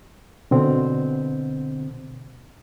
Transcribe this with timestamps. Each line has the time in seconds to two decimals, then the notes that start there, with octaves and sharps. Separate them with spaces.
0.51 B2 D3 C4